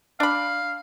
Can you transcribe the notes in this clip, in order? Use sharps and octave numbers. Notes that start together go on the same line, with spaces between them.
D4 F5 B5